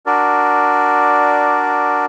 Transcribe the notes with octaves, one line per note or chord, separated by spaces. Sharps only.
D4 F#4 A#4 D5